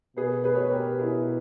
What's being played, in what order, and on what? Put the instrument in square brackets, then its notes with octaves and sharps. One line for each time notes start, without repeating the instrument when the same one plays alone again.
[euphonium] B2 [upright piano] G#4 B4
[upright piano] G#4 B4
C#5
[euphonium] B2
[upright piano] B4
G4 A#4
E4 G#4